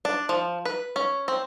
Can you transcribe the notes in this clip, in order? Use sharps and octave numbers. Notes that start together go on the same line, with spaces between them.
D4
F3
B4
C#4
C4